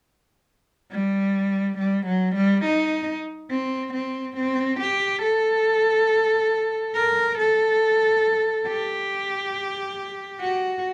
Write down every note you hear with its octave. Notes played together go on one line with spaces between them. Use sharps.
G3
G3
F#3
G3
D#4
C4
C4
C4
G4
A4
A#4
A4
G4
F#4